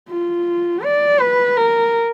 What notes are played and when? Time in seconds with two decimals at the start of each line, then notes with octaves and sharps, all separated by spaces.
0.10 F4
0.84 D5
1.21 B4
1.57 A#4